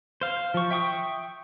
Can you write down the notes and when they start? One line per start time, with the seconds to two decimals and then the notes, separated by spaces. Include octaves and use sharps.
0.21 C5 F5
0.54 F3 C#6
0.71 E5 G5 C#6 D#6